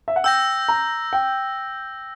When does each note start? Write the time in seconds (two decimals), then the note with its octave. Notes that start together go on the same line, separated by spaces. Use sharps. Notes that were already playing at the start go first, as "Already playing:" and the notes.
0.08 E5
0.16 F#5
0.24 G5 E6 G6 A#6
0.68 A#5
1.13 G5